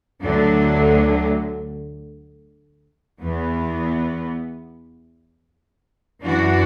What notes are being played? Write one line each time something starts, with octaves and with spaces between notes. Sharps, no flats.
D2 D3 F#3 D4
E2 E3 B3
F#2 E3 D4 F#4